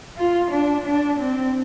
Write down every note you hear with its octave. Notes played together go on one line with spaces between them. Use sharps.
F4
D4
D4
C4